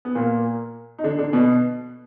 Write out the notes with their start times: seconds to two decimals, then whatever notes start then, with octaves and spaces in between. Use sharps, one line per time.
0.05 B3
0.15 A#2 A#3
0.99 D#4
1.04 D3 D4
1.18 D3 D4
1.33 B2 B3